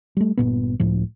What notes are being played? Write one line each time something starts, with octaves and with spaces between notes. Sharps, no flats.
G3 A3
G1 A#2 B3
C#2 A2 F3